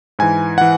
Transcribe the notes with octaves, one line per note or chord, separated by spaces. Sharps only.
G#2 E3 G#5
E3 F#5